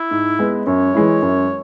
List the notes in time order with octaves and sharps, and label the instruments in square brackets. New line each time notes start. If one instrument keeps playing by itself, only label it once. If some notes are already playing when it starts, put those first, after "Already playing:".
Already playing: [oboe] E4
[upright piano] G#2
G#3 B3
[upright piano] F#2 [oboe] C#5
[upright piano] E3 G#3 E4
F#2